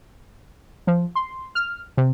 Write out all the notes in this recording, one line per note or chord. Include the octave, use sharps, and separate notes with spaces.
F3
C6
F6
C3